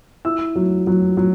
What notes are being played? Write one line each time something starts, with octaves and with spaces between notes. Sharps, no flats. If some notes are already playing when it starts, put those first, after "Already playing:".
E4 E6
F#3
F#3
F#3